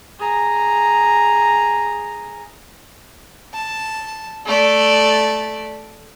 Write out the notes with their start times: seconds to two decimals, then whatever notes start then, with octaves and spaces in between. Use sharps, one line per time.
0.19 G#4 A#5
3.54 A5
4.46 A3 D5